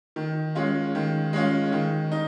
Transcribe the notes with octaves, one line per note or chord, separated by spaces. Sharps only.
D#3
G#3 C#4 F4
D#3
G#3 C#4 F4
D#3
D#4